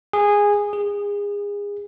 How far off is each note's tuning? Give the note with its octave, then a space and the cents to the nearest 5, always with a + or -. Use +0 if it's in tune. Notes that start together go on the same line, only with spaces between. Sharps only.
G#4 -15
G#4 -30